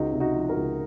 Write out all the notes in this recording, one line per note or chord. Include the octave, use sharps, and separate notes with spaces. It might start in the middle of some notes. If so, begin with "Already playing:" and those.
Already playing: C#2 D#4 F#4
C3
D#4 F#4
F3
F#4 A#4
C#2